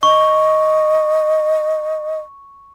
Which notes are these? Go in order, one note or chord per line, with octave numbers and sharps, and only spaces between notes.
D#5 C#6